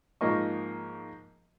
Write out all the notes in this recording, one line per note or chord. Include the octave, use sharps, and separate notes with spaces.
G#2 F3 A#3 D#5 C#6